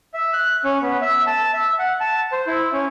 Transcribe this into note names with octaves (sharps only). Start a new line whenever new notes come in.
E5
F#6
C#4
B3
E5
A5
E5
F#5
A5
C5
E4
C#4